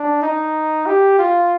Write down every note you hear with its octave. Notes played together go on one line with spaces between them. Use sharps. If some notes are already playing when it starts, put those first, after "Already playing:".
Already playing: D4
D#4
G4
F4